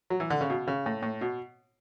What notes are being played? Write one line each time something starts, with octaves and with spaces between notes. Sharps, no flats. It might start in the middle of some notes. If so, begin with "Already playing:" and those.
F#3
E3
D3
C#3
B2
C#3
A2
A2
B2